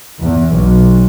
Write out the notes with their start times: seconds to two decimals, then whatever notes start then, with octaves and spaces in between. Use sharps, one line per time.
0.21 E2
0.52 B1